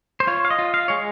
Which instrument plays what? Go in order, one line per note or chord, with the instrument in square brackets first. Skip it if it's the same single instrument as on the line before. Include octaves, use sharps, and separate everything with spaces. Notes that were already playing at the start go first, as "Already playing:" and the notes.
[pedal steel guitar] C5
F4 C#5
F5
D#5
F4
F5
G#3 C#5